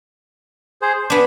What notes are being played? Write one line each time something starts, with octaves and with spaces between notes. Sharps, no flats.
G#4 C5
C5
B3 D4 G#5